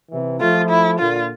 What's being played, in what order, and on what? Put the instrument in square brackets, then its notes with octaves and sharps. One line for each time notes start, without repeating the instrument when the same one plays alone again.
[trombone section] C3 E3
[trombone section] F3 A3 [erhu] F4
[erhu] E4
[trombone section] A#2 D3 [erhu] F4